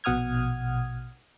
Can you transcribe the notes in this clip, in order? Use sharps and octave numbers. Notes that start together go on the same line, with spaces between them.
A#1 B2 F#5 D#6 F6 G#6